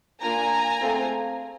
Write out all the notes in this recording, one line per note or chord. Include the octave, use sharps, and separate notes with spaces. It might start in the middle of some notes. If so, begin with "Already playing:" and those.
A#3 D4 F4 G#5 A#5
A3 C4 F4 G#4